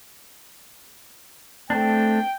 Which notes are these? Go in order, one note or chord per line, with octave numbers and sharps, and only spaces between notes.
A3 C4 D4 G5